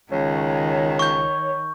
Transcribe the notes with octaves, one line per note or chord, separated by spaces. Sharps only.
C#2 D#3 C#5
C#6 G6